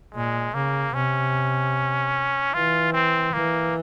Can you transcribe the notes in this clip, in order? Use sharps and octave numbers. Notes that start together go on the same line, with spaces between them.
A#2 G#3
C#3 A#3
C3 C#4
E3 F4
C4
E3 A#3